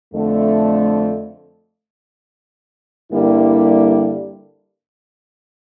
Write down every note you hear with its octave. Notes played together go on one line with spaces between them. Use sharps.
F2 D3 A3
G2 D3 G3 A#3 E4